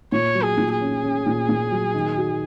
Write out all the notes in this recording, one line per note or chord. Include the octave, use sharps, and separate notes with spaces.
A#2 C#5
F#3
G#4
A#2
G#4
C#4
C#4
A#2
A#2
F#3
D#3
F#4